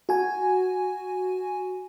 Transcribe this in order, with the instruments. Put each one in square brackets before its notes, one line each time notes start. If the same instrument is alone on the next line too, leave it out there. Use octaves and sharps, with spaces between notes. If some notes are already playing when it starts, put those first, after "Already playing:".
[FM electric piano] F#4 G#5